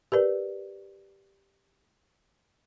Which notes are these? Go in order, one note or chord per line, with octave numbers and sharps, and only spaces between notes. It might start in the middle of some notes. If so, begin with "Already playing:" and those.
G4 A#4 B4 D5